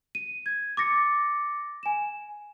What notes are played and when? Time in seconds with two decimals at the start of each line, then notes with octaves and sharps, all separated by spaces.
0.15 D#7
0.46 G#6
0.77 D6 A6 A#6 C#7
1.83 G#5 E7